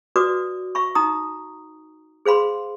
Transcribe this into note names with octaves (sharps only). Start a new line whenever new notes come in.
F#4 B4 D5 D6 D#6
E5 B5 C#6
D#4 A#5 D#6
G#4 C5 F5 B5 C6